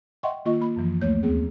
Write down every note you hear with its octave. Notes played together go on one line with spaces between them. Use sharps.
D#5 E5 F#5 G5 C6 C#6
D#3 A#3 F4 D#5 C#6
A#3 B5
F#2 E3 F3
D2 A3 A#3 C#5 G6
D#2 B3 C4 G#4